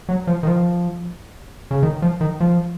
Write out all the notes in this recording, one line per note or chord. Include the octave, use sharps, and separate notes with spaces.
F#3
F3
D#3
F3
C#3
D#3
F3
D#3
F3